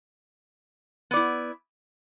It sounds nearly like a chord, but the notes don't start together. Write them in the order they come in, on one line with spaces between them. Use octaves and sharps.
B3 D5 E4